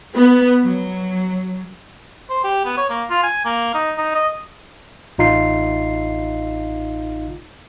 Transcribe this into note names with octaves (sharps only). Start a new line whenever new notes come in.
B3
F#3
C5
G4
B3
C#5
A#3
F4
G#5
A#3
D#4
D#4
D#5
A1 D#4 F4 C7